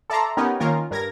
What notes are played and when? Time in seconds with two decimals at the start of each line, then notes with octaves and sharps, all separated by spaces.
0.10 A4 D5 E5 A5 A#5 C6
0.37 B3 C#4 D#4 G4 A#4
0.60 D#3 A#3 C#4 F4 A#4
0.91 G2 A#4 G#6 A#6